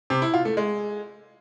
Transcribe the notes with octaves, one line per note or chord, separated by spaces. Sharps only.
C3
E4
F4
A3
G#3